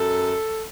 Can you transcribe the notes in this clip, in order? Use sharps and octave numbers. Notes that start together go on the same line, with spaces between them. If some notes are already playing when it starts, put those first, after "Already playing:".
Already playing: F#2 A4